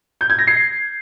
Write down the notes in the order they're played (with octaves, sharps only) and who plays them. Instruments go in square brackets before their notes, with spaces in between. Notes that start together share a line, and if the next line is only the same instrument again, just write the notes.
[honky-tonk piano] G6
G#6
A#6
C7